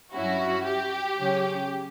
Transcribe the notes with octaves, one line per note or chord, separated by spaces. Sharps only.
G2 F#3 C#4 E4 F#4
G4
C#3 F#3 C#4